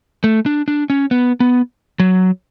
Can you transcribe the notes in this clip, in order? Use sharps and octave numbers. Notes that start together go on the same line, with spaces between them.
A3
D4
D4
C#4
B3
B3
F#3